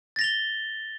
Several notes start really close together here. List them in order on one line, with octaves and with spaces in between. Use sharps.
A6 A#6 F7 G7